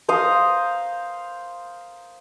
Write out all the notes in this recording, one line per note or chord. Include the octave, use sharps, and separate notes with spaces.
C5 F5 A#5 D#6